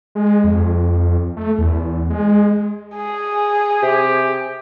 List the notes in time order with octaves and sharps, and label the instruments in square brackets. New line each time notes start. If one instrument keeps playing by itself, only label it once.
[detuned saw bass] G#3
F2
A3
E2
G#3
[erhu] G#4
[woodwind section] C3 G4